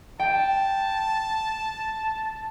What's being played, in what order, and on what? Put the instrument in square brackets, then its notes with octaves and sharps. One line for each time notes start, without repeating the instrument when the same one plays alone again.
[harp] G5 [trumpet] A5